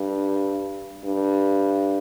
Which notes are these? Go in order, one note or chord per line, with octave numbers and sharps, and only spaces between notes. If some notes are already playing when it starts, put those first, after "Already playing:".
Already playing: G2
G2